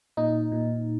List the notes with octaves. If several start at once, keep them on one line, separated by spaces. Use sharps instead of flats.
A#2 D#4
A#2